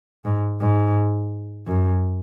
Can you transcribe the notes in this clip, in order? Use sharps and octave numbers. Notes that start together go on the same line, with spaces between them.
G#2
G#2
F#2